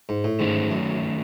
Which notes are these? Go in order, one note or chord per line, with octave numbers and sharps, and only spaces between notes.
G#2
A2
G#2 D#3 A3 C#4
F#2